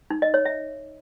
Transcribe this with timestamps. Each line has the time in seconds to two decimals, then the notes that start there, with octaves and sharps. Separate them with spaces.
0.10 D#4
0.22 D#5
0.34 C#5
0.45 E5